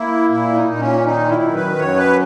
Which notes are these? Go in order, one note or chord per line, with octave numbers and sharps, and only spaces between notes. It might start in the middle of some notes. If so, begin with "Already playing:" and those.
Already playing: A#3 E4
A#2 E4
D#4
A#2
C#4
D#3 D#4
E4
F#2
B4
F#2 C#5
B4